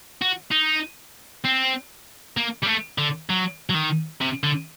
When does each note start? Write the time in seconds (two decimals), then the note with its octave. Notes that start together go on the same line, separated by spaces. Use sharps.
0.22 F#4
0.51 D#4
1.44 C4
2.37 A#3
2.63 G3
2.67 A3
2.98 D3
3.29 F#3
3.70 F#3
3.74 D#3
4.21 C3
4.43 D3